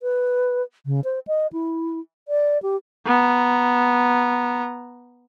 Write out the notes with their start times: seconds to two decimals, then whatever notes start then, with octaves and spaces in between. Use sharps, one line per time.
0.01 B4
0.86 C#3
1.04 C5
1.27 D#5
1.52 E4
2.28 D5
2.62 G4
3.06 B3 A#5